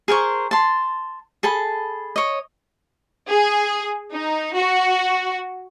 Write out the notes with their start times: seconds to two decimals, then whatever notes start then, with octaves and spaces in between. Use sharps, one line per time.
0.08 G#4 A#4 C5 C#6
0.51 A5 C6
1.43 G#4 A4 A5 B5
2.16 C#5 D#5
3.28 G#4
4.13 D#4
4.55 F#4